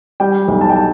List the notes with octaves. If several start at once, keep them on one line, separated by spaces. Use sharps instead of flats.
G3 G5
B1
A5
G5
A5